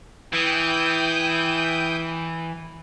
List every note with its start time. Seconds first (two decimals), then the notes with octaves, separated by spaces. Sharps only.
0.33 E3 G5 D#6 G6